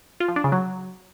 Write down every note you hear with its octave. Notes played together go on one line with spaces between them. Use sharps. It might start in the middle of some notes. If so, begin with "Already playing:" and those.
F4
F3
D4
C#3
F#3